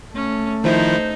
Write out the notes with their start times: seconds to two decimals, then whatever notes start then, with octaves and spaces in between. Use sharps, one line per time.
0.15 A3 C#4
0.64 D#3 F3 D#4 E4 C5